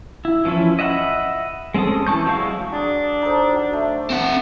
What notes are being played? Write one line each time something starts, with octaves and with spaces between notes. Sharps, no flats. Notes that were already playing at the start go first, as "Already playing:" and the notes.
E4
E3 F3 C#4 E4
D#5 E5 F#5 G5 B5
G#3 C4 C#4 A4 D#6
E3 A5 C#6 G6
F#3 G#3 E4 F5 C#6
F#3 D4 G#4
D#4 A4 C5
F#3
A3
C4 F#5